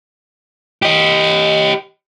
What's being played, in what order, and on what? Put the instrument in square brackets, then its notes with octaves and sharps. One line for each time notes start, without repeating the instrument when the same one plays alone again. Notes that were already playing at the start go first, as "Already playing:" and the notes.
[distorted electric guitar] G4 D#5